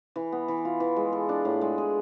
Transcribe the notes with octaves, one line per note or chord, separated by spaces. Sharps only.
E3
B3
E3
F4
E3
G#3
A4
D4
A2
G#3
G#4